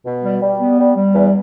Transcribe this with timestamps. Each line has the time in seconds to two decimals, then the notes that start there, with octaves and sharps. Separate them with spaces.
0.05 B2
0.23 G3
0.41 G3
0.59 B3
0.78 G3
0.96 G3
1.14 E2